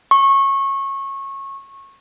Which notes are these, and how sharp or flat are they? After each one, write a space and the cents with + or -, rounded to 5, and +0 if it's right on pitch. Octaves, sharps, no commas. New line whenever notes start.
C#6 -20